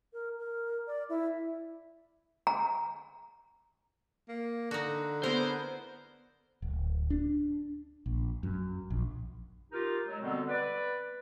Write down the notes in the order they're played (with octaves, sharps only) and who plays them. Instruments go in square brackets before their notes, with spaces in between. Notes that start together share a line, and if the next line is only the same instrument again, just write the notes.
[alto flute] A#4
A#4
D5
E4
[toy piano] A#5
[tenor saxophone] A#3
[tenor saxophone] D3 [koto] D#4 F#4
[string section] B3 [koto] E4 A#4 D#5 [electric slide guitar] C5
[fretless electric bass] D1
D4
A#1
F#2
A#1
[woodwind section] D#4 F4 G4 A#4
F#3 G#3
B2 D3 G3 B3 C4
B4 D5